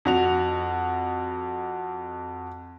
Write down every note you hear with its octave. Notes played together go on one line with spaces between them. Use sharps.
F2 F#4 F7